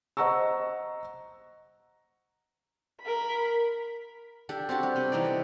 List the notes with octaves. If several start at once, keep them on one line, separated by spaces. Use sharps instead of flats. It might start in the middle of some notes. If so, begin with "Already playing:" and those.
C5 D#5 F#5 A#5 C#6 E6
A#4 B5
D4 G4 A4
C4 F#4 G4 A5
G3
C3
C3 E3 D#4 D5
A4